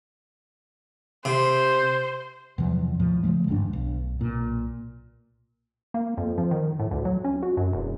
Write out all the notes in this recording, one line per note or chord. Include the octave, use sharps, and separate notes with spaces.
C3 C5
E2 C3 F3 F#3
D#2 A2 F3
C#3 F3 G#3 A3
G1 D#2 G#2 D4
B1
B1 A#2
A#3
F2
F3
D#3
A2
D2
F#3
C#4
F#4
F#2
E1